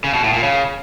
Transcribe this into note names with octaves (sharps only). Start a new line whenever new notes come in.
C#3
B2
A2
A#2
C#3